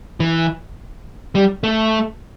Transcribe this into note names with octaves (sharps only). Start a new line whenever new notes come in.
E3
G3
A3